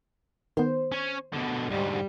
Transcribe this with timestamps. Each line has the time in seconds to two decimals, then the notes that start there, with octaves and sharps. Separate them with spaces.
0.57 D#3 B3 C5
0.92 C#4 C#5
1.33 B2 D3
1.69 D2 G#2 G3